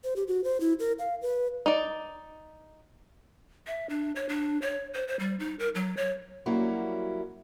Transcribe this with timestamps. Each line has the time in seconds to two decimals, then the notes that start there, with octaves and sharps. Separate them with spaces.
0.04 C5
0.16 G4
0.28 F#4
0.44 C5
0.60 E4
0.79 A#4
0.99 F5
1.22 B4
1.66 D#4 D5
3.67 E5
3.89 D4
4.16 C#5
4.29 D4
4.62 C#5
4.94 C5
5.08 C5
5.19 G3
5.40 D#4
5.59 A#4
5.75 F#3
5.97 C#5
6.46 F#3 G3 A#3 C#4 E4 F#4